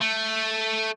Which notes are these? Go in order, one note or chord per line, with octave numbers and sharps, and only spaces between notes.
A3